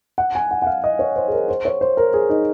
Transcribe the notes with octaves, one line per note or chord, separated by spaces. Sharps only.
F#5
G#5
F#5
F#5
F5
D#5
C#5
C5
G#4
A#4
C5
C#5
C5
A#4
G#4
D#4